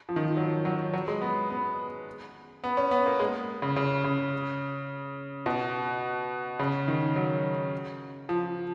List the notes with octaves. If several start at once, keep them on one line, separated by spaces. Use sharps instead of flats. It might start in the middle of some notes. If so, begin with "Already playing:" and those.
F3
D#3
F3
F#3
F#3
F#3
G#3
B3
B3
B3
C#4
B3
A#3
G#3
C#3
C#3
C#3
B2
C#3
D#3
F#3
F3